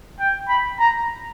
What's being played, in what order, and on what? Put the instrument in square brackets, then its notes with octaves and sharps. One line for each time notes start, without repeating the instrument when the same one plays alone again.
[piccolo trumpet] G5
B5
A#5